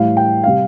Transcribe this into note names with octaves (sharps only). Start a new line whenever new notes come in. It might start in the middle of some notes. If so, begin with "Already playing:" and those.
Already playing: A2 E3 G3 F5
G5
C3 G3 F5